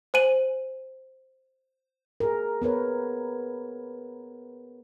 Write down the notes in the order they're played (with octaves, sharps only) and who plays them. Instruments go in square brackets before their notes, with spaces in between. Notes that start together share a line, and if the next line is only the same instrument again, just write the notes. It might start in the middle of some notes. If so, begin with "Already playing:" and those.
[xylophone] C5 G#5 D#7 F#7
[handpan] G#4 A#4
B3 A#4 B4 C#5